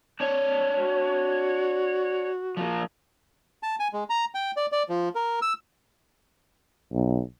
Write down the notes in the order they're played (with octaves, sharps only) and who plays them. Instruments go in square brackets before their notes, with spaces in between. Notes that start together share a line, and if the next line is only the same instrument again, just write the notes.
[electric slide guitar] D4 C#5
[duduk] F#4
[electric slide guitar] F3 A#3
[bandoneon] A5
G#5
G#3
A#5
G5
D5
D5
F3
A#4
E6
[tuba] B1